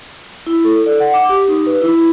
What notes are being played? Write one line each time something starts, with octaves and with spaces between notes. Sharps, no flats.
E4
A4
D5
F#5
D6
G4
D#4
B4
E4